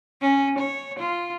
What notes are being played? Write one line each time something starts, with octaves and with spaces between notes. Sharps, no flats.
C#4
C#5
F4